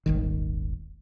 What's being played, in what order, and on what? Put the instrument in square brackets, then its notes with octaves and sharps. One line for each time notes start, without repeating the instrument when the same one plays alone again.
[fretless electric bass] D#1 G#1 D#3